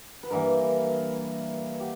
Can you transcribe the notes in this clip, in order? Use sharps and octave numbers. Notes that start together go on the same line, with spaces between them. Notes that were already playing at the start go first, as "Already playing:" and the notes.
B4
G2 E3 A#3 A#4
G4